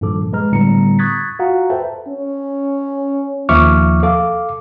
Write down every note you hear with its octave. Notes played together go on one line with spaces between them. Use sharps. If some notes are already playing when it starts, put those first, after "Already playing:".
G2 A#2 D#3 F3 A4 D6
G#3 B4 A#5 F6
A2 D3 G3 B3 A#5 C#7
C#6 D#6 F#6 G#6 A6 B6
F4 F#4 F5 F#5 A#5
A4 B4 C5 E5 G5 A5
C#4
D#2 F3 E5 C#6 D6 F6
A4 F5 D6